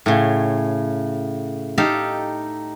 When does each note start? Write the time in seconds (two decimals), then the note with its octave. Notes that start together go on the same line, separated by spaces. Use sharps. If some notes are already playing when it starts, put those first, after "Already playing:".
0.06 A2 C#3
1.78 D#4 G4 A4 F5